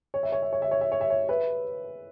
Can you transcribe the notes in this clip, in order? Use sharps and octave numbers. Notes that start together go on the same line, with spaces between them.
C#5
E5
C#5
E5
C#5
E5
C#5
E5
C#5
E5
C#5
B4 E5